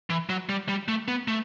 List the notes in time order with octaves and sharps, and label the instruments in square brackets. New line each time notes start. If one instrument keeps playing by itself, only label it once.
[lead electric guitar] E3
F#3
G3
G3
A3
B3
A3